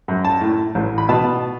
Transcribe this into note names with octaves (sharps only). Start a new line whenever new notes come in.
F#2
A5
A2
A1
B5
B2 A5